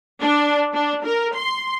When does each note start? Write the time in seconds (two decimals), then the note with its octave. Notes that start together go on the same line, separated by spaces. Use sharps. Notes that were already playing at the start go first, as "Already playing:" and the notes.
0.21 D4
0.73 D4
1.05 A#4
1.35 C6